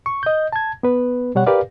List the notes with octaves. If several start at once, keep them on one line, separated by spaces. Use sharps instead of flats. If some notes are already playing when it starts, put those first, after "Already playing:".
C#6
D#5 G6
A5 G#6
B3 B4
B2 G3 C#5 F#5
G4 A#4 B4 D5 F5